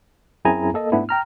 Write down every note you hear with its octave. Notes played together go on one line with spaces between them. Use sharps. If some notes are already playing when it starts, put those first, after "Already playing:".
F#2 C4 E4 G#4 G#5 A#5
A#3 A4 D#5
G#2 A3 B3 D4 E4
G5 A#5 F6